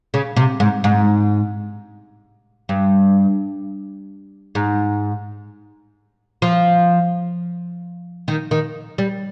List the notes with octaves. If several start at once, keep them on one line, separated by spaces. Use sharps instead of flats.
C#3
C3
G#2
G#2
G2
G#2
F3
D#3
D#3
G3